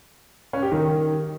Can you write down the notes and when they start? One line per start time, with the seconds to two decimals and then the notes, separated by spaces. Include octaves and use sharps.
0.53 C#4
0.63 G4
0.72 D#3